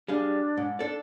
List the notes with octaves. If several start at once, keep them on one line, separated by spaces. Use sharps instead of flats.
G3 D4 G#4 F5
G#2
D4 A4 D5